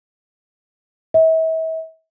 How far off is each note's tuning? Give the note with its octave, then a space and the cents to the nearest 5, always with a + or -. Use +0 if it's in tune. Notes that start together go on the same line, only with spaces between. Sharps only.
E5 -40